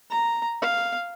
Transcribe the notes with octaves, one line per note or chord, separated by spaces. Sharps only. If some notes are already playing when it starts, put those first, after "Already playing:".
A#5
F5